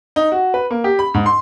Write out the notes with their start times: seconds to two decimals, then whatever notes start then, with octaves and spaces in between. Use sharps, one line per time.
0.16 D#4
0.32 F#4
0.54 B4
0.71 A#3
0.84 G4
0.99 B5
1.14 G#2
1.26 C6